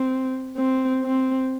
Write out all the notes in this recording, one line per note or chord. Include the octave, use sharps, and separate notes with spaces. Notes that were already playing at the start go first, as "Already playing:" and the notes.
Already playing: C4
C4
C4